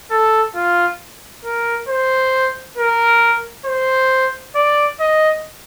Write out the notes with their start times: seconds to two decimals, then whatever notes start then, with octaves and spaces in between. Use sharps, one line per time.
0.11 A4
0.55 F4
1.45 A#4
1.89 C5
2.78 A#4
3.66 C5
4.55 D5
5.00 D#5